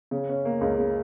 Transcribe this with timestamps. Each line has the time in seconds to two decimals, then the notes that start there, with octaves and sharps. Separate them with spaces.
0.11 C#3
0.29 C#4
0.45 A#3
0.61 C#2
0.78 C#3